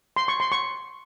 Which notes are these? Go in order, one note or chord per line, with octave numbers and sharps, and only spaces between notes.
C6
C#6
C6
C#6